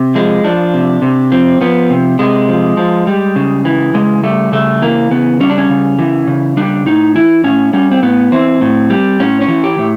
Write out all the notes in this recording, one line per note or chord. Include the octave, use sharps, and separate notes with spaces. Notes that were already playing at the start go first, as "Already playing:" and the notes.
Already playing: C3
F3 G#3
F3 D4
C3
C3
F3 C4
F3 B3
C3
C3 G#3
F3
F3
G3
C#3
E3
C#3 G#3
G3 A3
C#3 A3
E3 A#3
C#3 B3
G3 C#4
D4
C#4
C#3
E3
C#3
G3 D4
A2 D#4
E3 E4
A2 C#4
G3 C#4
C4
A2 B3
E3 C4
A2
G3
A2 C#4
C#4
E3
G4
A2